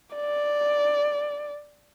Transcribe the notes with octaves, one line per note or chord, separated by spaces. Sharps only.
D5